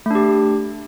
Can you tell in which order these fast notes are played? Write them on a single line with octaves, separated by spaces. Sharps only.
A3 D4 G4